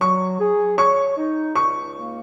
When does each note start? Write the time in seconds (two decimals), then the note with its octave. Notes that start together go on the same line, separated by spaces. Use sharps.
0.01 F#3 C#6
0.40 G#4
0.78 C#5 C#6
1.17 D#4
1.55 C#2 C#6
1.94 A#3